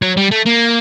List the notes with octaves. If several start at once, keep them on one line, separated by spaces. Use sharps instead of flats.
F#3
G3
A3
A#3